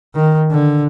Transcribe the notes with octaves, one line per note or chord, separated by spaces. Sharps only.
D#3
D3